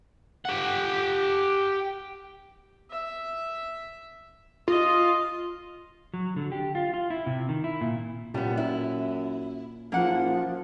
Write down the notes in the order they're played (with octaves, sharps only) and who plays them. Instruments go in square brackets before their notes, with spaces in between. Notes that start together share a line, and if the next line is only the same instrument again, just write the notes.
[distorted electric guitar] G4 F#5
[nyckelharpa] E5
[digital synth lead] F4 [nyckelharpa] D#5
[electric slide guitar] F#3
D3
G4
F4
F4
E4
C3
D#3
E4
A#2
[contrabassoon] F#2 [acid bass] A#2 [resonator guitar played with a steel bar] G3 B3
[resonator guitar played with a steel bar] E4
[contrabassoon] F#1 [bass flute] F3 [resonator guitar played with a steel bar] A#3 F#5